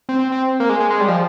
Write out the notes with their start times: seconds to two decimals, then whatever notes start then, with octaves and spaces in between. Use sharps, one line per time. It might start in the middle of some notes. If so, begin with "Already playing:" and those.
0.09 C4
0.19 C4
0.32 C4
0.60 A#3
0.69 G#3
0.80 G#3
0.90 G#3
1.00 G3
1.08 F3